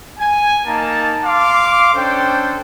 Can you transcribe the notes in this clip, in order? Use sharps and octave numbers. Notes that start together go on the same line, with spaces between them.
G#5
A#3 D#4 A5
F5 C6 D6
C#4 D4 A4 C5 G5